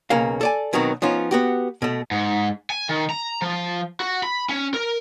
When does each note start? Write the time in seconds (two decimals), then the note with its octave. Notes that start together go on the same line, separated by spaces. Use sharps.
0.10 B1 C#3 A#3 F5
0.41 A4 D5 G#5
0.73 B2 D#3 F#3 B3 C4
1.02 F3 B3 C#4 D#4 F4
1.31 B3 F#4 G4
1.82 B2 A3
2.11 G#2
2.70 G#5
2.89 D#3
3.10 A#5
3.42 F3
4.00 F#4
4.23 B5
4.49 C#4
4.74 A#4